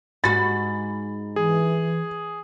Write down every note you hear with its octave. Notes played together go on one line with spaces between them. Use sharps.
G#2 F#4 B5 A6
E3 G#4